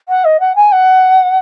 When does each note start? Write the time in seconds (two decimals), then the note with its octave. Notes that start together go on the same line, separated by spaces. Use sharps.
0.09 F#5
0.25 D#5
0.40 F#5
0.56 G#5
0.72 F#5